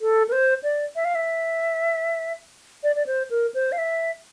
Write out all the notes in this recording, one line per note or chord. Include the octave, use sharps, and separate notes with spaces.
A4
A#4
C5
D5
E5
F5
E5
D5
D5
C5
A#4
C5
F5
E5